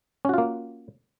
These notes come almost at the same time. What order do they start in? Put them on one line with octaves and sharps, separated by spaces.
C#4 F#4 F4 A#3